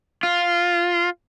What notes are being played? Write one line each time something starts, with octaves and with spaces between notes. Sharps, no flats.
F4